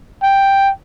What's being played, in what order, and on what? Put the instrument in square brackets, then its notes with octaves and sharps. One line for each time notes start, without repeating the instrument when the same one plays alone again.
[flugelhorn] G5